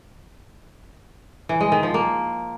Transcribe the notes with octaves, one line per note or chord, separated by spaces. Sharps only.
E3
G#3
D#3
F3
A#3